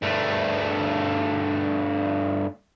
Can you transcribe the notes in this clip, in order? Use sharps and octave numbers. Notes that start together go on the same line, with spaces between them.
G2 A3